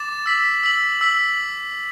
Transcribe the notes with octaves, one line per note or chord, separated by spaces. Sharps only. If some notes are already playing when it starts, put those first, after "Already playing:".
Already playing: D6 A6 E7
E6 B6 F#7
E6 B6 F#7
E6 B6 F#7